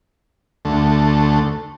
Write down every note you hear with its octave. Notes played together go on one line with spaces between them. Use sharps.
D2 A3